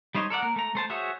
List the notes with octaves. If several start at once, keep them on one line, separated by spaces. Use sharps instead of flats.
G3 D#4 C5 C#5 D#5
A4 A#4 D5 F#5
A#3 A#4
A3 A#5
A3 C5 A5
F#4 G#4 C5 C#5 E5